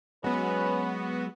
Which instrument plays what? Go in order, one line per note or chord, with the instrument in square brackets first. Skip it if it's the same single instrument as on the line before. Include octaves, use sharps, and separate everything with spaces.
[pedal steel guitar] F#3 G#3 [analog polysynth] B3 F#4 [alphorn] C#4 [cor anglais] B4